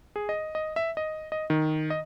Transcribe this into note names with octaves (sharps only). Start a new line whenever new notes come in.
G#4
D#5
D#5
E5
D#5
D#5
D#3
D#5